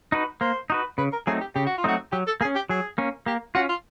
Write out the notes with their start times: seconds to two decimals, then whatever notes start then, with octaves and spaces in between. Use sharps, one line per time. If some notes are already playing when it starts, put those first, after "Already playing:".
0.12 D#4 F#4 B4
0.41 A#3 C5
0.70 D#4 F#4 B4
0.98 C#3 B4
1.13 A#4
1.26 F#3 A3 C4 D#4 G#4
1.41 G4
1.55 C#3 G4
1.66 F#4
1.78 F4
1.84 F#3 A3 C4 D#4 F#4
2.12 F#3 G4
2.27 A4
2.41 A#3 G#4
2.45 C#4
2.55 G4
2.69 F#3 G#4
2.98 A#3 C#4
3.26 A#3 G4
3.55 C#4 F4 F#4
3.69 F4